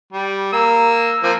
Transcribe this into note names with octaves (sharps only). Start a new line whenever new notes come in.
G3
A#3 E6
F3 A#3 C4